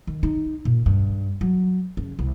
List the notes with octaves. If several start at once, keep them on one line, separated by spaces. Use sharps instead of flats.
D#3
D#4
A#2
G2
F#3
C#3
C2